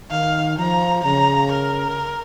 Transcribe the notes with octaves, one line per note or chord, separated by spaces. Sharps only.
D#3 F5
F3 A#5
C#3 A#5
A#4